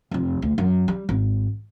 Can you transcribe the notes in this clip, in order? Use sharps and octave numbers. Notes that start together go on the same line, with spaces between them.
F1 F2
D2
F#2
G3
G#1